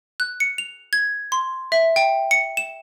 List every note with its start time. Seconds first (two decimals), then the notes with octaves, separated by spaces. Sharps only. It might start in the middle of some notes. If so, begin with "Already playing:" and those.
0.20 F#6
0.40 C#7
0.58 F7
0.93 G#6
1.32 C6
1.72 E5
1.96 G5
2.31 C#7
2.57 E7